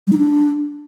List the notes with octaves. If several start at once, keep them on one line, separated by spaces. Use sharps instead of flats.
G3
D#4
D4